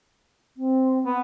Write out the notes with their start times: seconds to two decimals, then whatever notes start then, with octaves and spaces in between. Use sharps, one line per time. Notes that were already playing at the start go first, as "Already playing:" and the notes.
0.57 C4
1.06 B3